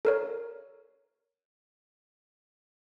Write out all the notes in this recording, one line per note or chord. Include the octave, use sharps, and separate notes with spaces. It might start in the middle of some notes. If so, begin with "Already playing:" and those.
A4 A#4 C#5